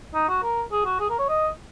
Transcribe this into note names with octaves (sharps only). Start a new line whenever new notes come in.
D#4
F#4
A#4
G#4
F#4
G#4
A#4
C#5
D#5